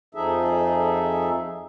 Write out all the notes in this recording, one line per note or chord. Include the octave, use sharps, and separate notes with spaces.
F2 F3 D#4 G#4 A4 E5